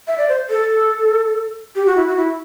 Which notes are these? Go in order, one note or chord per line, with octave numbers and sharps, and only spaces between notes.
E5
D5
C5
A4
G4
F#4
E4
F#4
E4